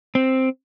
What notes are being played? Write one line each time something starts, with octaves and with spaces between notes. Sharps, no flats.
C4